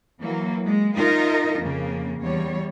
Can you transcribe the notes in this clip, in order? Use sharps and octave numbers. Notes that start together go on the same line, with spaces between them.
E3 F#3 A#3
G#3
D#4 F4 A#4 D#5 E5
F2 C#3 A#3
E2 G3 C#5